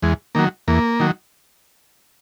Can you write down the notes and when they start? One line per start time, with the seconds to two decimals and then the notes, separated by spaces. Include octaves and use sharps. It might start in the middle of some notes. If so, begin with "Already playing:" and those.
0.02 E2 G#3
0.35 D#3 F#3 A#3
0.68 E2 A#3
1.00 D#3 F#3